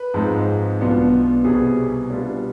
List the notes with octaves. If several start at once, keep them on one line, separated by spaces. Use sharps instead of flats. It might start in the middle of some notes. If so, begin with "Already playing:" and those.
Already playing: B4
G#2 F3 G#3 C4 D#4
B1 B2 B3 D4 F4
C2 B2 G3 G#4
B2 G3 D4 F4